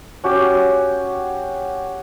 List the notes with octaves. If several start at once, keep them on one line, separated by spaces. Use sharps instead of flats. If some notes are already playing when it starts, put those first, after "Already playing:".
C#4 F#4 G4